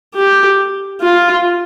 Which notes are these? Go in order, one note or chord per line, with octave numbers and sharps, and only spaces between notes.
G4
F4